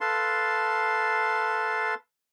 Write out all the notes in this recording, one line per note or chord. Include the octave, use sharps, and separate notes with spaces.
A4 B4 F5 A5 C6